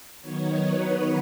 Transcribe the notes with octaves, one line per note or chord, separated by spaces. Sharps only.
D#3 F#3 B3 D#4 C#5
B4